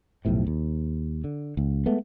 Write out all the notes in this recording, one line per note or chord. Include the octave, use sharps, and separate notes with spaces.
B1 F2 A2 C3
D#2
D3
C#2
G#3 A3 B3